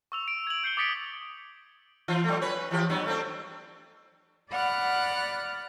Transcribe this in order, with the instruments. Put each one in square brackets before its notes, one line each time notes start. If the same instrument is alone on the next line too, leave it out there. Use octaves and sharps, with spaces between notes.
[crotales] C#6 E6 F7
D7
G#6 F#7
E6 G6 C7 C#7 F#7 G7
D6 D#6 A6 B6 C#7 D7
[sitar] E3 F4
F#3 A3
C#4 B4 C#5
E3 F3 G4
G2 F#3 B3
A3 C4 D4
[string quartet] D5 F#5 B5 F6 F#6